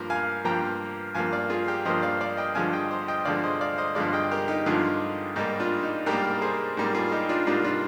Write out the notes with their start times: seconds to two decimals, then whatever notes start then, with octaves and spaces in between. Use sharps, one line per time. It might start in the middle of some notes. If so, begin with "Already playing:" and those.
Already playing: G2 F3 A#3 A#4
0.10 F5 G#5
0.45 G2 F3 A#3 G5 A#5
1.14 G2 F3 A#3 F5 G#5
1.33 D5 F5
1.50 F4 G#4
1.68 G4 A#4
1.85 G2 F3 A#3 C5 D#5
2.02 D5 F5
2.21 D5 F5
2.37 D#5 G5
2.55 G2 D3 F3 G#3 F5 G#5
2.73 D#5 G5
2.91 C5 D#5
3.08 D#5 G5
3.25 G2 D3 F3 G#3 D5 F5
3.44 C5 D#5
3.61 D5 F5
3.78 C5 D#5
3.95 G2 D3 F3 G#3 D5 F5
4.13 D#5 G5
4.31 G4 A#4
4.48 D#4 G4
4.66 G2 D3 F3 G#3 F4 G#4
5.36 G#2 G3 A#3 D#4 G4
5.60 D4 F4
5.83 D#4
6.06 G#2 G3 A#3 G4 A#4
6.42 G#4 C5
6.77 G#2 G3 A#3
6.95 F4 G#4
7.12 D#4 G4
7.29 D4 F4
7.47 G#2 G3 A#3 D4 F4
7.64 D4 F4